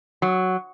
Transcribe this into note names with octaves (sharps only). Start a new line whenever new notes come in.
F#3